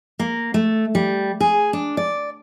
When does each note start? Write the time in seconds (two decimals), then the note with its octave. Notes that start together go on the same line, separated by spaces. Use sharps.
0.19 A#3
0.54 A3
0.95 G3
1.40 G#4
1.73 D4
1.97 D5